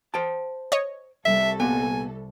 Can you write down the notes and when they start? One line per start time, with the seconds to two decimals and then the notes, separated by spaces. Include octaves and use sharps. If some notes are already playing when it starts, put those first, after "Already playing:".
0.14 C5 G5 A5
0.72 C#5 D#5
1.25 C2 A4 E5
1.60 A#2 B3 G#5